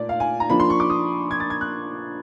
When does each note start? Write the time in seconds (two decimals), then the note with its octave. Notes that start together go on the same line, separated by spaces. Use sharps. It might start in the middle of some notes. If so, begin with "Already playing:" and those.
Already playing: A#2 A3 D5
0.09 F5
0.20 G#5
0.40 A#5
0.50 F3 A#3 D4 B5
0.60 C6
0.70 C#6
0.80 D6
0.90 D#6
1.31 G#6
1.40 A6
1.50 G#6
1.61 F#6